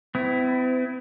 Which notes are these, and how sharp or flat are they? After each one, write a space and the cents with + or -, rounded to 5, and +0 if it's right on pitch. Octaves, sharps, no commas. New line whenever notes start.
C4 -45 E4 +5